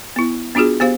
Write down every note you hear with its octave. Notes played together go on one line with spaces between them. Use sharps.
B3 E4
B3 D4 F4 F#4 G#4
B3 G4 C5 F5